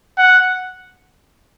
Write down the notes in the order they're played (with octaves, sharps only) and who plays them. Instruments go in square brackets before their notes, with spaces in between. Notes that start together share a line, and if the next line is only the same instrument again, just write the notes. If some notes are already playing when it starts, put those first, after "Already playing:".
[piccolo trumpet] F#5